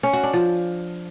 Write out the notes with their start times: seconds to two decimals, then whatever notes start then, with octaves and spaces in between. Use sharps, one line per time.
0.03 C#4
0.13 F#4
0.23 D4
0.33 F3